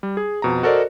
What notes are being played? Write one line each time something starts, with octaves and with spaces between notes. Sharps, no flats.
G3
G#4
F2 B2 A#5
F#4 A4 A#4 C5 D5 D#5